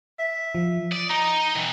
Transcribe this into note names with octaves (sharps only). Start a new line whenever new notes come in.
E5
F3
D5 D#6
D#4 A#5
B2 E3